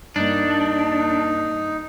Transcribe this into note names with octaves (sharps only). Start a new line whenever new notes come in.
G2 A#3 D4 D#4